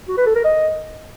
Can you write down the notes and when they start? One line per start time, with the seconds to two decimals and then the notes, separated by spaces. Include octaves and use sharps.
0.08 F#4
0.17 B4
0.26 A4
0.35 A#4
0.44 D#5